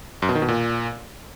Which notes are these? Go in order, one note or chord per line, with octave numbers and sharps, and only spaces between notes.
F#2
B2
D#3
B2
A#2